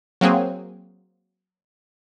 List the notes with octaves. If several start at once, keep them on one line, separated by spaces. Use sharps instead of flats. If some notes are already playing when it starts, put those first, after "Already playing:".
F#3 A#3 C4 G#4